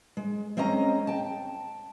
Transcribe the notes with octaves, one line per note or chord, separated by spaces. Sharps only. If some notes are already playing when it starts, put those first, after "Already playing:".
G#3
G#3 C4 C#4 D#5 A#5
G5 A5